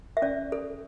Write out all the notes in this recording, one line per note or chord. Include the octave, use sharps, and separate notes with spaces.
E5
C#4 D5
A4